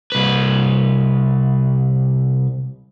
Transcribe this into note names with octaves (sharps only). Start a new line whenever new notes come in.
C2 B4